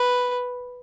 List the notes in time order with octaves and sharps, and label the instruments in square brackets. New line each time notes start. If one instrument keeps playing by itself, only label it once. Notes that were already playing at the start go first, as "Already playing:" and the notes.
Already playing: [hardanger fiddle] B4